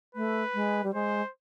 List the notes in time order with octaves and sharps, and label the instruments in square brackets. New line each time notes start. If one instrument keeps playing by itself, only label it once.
[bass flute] A3 [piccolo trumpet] B4
[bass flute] G#3
G3
[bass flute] G#3 [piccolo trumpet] C5